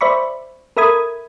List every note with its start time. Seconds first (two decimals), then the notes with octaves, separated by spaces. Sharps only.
0.01 C5 D5 E5 B5 C#6
0.77 A4 A#4 E5 B5 D#6 G#6